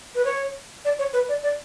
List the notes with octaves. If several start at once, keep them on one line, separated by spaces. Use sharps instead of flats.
B4
C#5
D5
C#5
B4
D5
D5